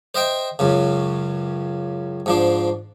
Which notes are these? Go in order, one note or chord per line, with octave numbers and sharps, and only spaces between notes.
C5 D#5 E5 G5
C#2 F#2 C#3
G#2 F3 D4